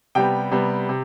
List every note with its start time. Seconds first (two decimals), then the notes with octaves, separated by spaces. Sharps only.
0.15 C3 G3 B3 G5
0.51 C3 G3 B3
0.89 C3